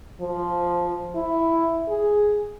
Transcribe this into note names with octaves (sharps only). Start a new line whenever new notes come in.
F3
E4
G#4